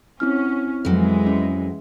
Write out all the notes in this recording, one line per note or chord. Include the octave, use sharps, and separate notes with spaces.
C4 C#4 E4 F6
F2 E3 F#3 G#3
C#4